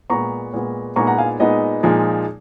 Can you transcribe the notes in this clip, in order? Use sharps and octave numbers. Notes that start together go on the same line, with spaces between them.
A#2 G#3 B3 A#5 C#6
A#2 G#3 B3
A#2 G#3 B3 D#4 A#5 C#6
F#5 A#5
F5 G#5
A#2 G#3 B3 D#4 D#5
A#2 F3 G#3 D#4